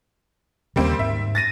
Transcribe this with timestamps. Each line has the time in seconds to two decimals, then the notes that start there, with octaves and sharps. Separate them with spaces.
0.76 D#2 C#3 G3 A#3 C4
0.99 G#2 E5
1.35 A6 A#6 D#7